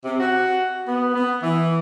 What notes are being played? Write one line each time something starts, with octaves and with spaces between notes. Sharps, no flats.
C3
F#4
B3
B3
E3